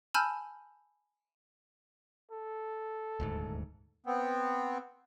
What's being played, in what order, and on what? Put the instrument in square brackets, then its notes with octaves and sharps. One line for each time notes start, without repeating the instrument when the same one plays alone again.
[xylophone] G#5 A5 B5 E6 F6 G6
[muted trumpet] A4
[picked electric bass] D#1 D2 G#2
[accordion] B3 C4